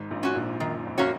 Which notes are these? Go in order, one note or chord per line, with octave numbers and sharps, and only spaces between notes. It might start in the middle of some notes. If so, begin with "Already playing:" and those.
Already playing: G#1 G#2
A#1 A#2
C#4 F#4
A#1 A#2
F#2 D#3
F2
A#3 C#4 F#4 C#5